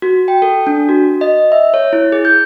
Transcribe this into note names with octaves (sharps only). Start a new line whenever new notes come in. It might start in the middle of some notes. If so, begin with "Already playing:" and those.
F#4
G5
A4
D4
F#4
D#5
E5
C#5
E4
G#4
G6